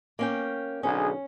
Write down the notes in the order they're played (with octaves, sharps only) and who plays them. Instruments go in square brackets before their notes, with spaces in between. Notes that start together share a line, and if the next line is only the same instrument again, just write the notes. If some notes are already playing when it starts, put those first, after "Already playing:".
[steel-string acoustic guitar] A#3 C#4 G5
[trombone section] B1 D3 G#4 [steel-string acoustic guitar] C#4